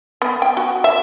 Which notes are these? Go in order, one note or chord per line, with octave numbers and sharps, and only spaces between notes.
B3
G5
F#4
E5